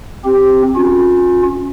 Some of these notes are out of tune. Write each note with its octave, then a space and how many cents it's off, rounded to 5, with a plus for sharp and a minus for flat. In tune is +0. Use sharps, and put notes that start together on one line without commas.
C4 +0 G4 +0
C#4 +0 F4 +40